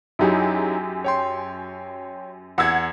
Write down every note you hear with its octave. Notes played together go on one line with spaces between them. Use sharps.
F#2 F#3 D#4 E4 G4 G#4
C#5 G5 C6
E2 F#5 E6 G#6